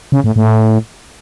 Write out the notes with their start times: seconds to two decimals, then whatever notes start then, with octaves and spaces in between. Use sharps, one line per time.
0.12 C#3
0.24 A2
0.36 A2